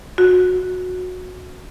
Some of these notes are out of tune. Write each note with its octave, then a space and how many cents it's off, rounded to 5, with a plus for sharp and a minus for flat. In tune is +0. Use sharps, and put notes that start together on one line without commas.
F#4 -20